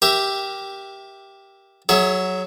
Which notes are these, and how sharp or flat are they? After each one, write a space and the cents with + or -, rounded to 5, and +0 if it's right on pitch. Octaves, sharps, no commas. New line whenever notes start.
G4 +0 A#4 +25 E5 +0
F#3 +0 G#4 +30 E5 +0